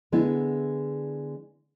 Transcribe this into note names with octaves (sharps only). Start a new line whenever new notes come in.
D3 G#3 B3 D4 E4